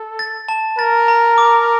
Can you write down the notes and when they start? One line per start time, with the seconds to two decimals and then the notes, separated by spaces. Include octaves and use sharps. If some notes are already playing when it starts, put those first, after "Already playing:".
Already playing: A4
0.19 A6
0.49 A5
0.79 A#4 A6
1.08 A#5
1.38 D6